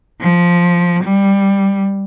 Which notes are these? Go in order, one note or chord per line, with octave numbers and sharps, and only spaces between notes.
F3
G3